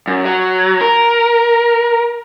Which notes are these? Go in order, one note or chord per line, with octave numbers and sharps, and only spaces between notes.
F#2
F#3
A#4